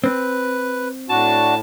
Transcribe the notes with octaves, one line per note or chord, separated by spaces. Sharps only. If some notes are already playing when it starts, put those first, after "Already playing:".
C4 B4
A2 D4 F#4 A5